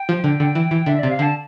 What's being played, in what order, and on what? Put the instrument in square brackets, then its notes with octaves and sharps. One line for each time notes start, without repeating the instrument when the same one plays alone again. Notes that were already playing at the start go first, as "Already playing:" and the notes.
Already playing: [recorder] G5
[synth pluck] F3
D3
D3
E3
E3
[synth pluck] D3 [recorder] E5
[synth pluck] C3 [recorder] D5
[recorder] F5
[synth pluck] D3 [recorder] A5